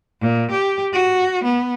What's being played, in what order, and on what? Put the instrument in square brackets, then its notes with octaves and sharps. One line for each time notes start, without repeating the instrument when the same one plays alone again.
[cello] A#2
G4
F#4
B3